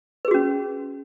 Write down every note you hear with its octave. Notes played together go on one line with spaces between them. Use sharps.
C#4 F#4 G#4 B4